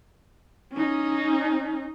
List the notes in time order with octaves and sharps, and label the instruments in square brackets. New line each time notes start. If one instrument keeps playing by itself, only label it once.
[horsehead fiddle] C#4 D#4